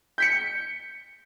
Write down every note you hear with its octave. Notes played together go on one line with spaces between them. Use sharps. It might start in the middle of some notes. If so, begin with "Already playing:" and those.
G6 B6 C#7